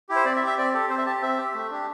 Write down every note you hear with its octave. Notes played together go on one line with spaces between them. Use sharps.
E4 G4
C5
C4 D5
E5
G4
E5
C4 D5
G4 A4
C4 C5
E5
G4 A5
C4 E5
G4
A3
D4 G4